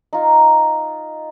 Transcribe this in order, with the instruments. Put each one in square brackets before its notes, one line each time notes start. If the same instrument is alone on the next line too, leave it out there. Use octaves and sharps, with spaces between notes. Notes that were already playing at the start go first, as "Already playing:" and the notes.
[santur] D#4 F4